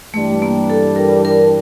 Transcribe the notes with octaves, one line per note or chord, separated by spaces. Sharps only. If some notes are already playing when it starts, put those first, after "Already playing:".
G2 E3 G3 A3 D4 G4
A#3
A4
A#4
A#4